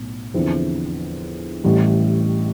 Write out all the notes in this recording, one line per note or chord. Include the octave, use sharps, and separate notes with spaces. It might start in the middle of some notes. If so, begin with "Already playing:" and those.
Already playing: B1 A2
E2 D3 F3 C4 E4
A1 A2 E3 G3